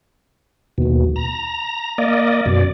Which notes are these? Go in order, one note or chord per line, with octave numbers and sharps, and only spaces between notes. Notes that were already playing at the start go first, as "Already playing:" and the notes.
D#2 B2
A#5
A#3 D5 D#5
F#2 B2 D5